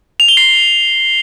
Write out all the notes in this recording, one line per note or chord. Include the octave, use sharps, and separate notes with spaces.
F7
G7
C7